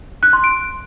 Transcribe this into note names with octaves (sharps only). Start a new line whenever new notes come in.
F#6
C6
D7